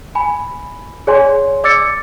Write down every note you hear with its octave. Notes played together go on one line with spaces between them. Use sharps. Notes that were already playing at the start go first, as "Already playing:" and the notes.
G#5 B5
G#4 C#5 D5 G#5 C6
D5 D6 E6 A6 C#7